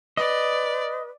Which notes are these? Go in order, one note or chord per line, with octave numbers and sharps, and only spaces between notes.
B4 D5 D#5